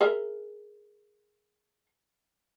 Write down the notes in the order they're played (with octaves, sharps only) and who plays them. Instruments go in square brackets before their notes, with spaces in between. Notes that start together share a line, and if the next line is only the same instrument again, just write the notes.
[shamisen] G#4 A#4 E5